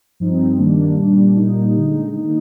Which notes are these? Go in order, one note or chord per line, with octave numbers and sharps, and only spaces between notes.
G2 F3 C4 D#4
G2 D#3 G3 A#3 D4
A#2 G3 D4
A#2 G3 A#3 D#4
D3 G#3 D#4
D#3 A#3 D#4